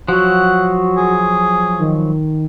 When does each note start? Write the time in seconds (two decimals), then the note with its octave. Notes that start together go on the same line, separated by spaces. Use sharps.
0.08 F3 F#3 F#4 F#5
0.97 G#4
1.79 D#3